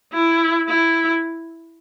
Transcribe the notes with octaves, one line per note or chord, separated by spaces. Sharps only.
E4
E4